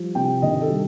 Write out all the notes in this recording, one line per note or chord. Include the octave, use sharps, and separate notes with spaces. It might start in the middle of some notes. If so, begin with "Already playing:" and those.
Already playing: F3 G3
C3 G5
D#3 D#5
A4
G3